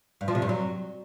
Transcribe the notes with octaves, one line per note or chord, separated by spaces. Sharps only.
G2
F3
C3
G2
F#3